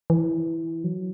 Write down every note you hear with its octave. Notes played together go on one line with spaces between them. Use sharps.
E3
F#3